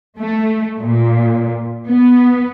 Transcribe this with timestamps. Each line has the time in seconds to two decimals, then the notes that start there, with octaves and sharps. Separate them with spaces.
0.18 A3
0.79 A#2
1.87 B3